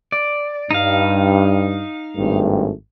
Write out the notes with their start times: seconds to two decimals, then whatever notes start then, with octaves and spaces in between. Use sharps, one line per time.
0.12 D5
0.71 G2 D#4 F5
2.17 G#1 G2 A3